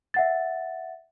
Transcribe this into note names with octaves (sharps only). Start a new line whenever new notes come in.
E5 F#5 A6